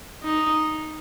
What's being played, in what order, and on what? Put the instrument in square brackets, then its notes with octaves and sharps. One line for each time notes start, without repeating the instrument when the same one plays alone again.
[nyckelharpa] D#4